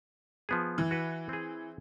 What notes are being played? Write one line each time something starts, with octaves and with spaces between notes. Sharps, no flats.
F3 B3 G#4
E3
F#4 B4
C4 G#4